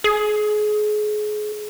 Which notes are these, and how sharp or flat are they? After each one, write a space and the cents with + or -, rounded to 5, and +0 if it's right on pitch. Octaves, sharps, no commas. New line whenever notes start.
G#4 +30